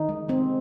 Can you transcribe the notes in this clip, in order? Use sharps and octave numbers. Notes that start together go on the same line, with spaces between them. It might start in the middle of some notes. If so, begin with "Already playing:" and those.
Already playing: D#3 D#4
G#3
G#3 C4